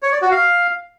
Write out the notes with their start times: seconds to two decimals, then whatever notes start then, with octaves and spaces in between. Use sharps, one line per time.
0.03 C#5
0.12 D5
0.22 F#4
0.31 F5